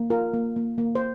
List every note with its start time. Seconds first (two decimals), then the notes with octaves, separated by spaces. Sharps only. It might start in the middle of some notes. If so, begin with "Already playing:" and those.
Already playing: A#3
0.10 F4 A#4
0.34 A#3
0.56 A#3
0.78 A#3
0.95 C5